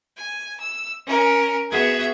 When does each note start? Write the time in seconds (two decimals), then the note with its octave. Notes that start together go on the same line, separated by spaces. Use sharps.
0.17 G#5
0.59 E6
1.05 C#4 A#4
1.71 B3 F#4 G#4 E5 G#6